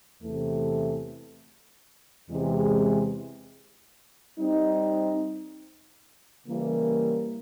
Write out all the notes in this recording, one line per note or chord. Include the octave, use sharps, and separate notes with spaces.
E2 C3 E3 A3
E2 C3 E3 G#3
G3 C4 D#4
C#3 E3 G3 A#3